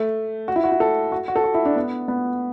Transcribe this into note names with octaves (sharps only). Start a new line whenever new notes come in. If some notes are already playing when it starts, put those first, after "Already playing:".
Already playing: A3
F#4
E4
F#4
E4
A4
F#4
F#4
A4
F#4
E4
D4
B3
B3